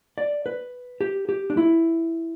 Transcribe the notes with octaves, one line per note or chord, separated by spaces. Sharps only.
D5
B4
G4
G4
D4
E4